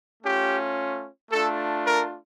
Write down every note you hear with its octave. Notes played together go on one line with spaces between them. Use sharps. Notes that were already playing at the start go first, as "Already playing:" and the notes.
A3 C#4 F4 G4
A3 D4 F4 A4
A#4